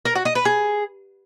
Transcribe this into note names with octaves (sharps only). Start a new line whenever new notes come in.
A#4
F#4
D#5
B4
G#4